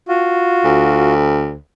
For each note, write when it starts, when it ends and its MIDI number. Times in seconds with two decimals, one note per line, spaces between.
0.08 1.13 65
0.08 1.13 66
0.64 1.56 38